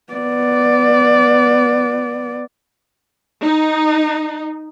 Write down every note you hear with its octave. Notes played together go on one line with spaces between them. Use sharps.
B3 D5
D#4